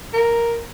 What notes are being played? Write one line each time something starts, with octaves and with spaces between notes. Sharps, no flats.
A#4